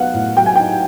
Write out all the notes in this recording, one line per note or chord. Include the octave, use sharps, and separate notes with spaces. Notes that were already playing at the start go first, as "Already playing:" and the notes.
Already playing: F#3 B3 D#4 F5 F#5
A2
F#3 G5
G#5
D#4 G5